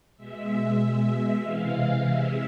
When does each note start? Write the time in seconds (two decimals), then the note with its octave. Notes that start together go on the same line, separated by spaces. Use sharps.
0.17 B2 G#3 E5
0.80 B2
0.85 G#3
1.42 C3 E3 G#3 F5
2.05 C3 G#3 E5